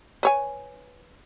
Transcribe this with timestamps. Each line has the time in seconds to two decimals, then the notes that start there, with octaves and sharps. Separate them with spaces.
0.23 B4 C#5 G#5